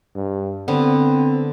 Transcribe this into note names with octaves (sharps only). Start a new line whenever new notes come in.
G2
D3 B3 C4